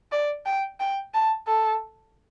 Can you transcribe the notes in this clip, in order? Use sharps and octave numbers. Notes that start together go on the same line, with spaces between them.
D5
G5
G5
A5
A4